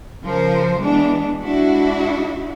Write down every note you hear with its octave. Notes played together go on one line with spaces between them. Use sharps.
C#3 F3 A#4 C5
E3 G#3 B3 D4
G#3 D4 E4 F#4